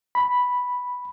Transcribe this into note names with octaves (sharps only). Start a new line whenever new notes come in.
B5